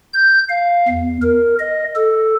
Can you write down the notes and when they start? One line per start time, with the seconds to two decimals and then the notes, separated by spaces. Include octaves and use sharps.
0.14 G6
0.49 F5
0.89 E2
1.22 A#4
1.59 D#5
1.96 A4